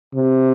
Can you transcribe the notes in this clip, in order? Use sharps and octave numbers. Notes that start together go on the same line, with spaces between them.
C3